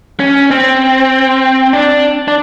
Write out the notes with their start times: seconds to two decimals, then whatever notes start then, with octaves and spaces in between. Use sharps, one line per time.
0.20 C#4
0.51 C4
1.73 D4
2.28 D4